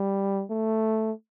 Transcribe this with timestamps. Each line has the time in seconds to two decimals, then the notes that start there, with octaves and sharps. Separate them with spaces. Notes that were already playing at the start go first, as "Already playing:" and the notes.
Already playing: G3
0.50 A3